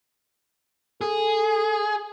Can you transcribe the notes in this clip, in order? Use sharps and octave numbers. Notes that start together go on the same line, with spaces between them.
G#4 A4